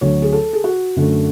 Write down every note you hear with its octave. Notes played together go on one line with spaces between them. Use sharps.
D2 D3 F#3 C#5
G#4
A4
G#4
F#4
F#2 D3 A3